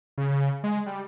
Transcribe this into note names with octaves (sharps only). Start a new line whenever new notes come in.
C#3
G#3
G3